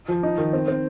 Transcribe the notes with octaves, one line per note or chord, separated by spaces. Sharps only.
F3
D#4
D#3
C4
C4